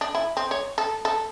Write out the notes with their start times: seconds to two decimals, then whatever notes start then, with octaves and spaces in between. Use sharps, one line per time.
0.01 D4
0.15 E4
0.37 C4
0.51 C#5
0.78 A4
1.05 A4